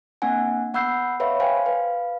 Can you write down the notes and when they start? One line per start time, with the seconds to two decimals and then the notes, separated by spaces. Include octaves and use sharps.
0.22 A#3 C4 D4 F#5 G#5
0.74 B3 F#5 B5 E6 G6 C7
1.20 B4 C#5 E5 F5 B5
1.40 C5 F5 G5 G#5
1.66 B4 F5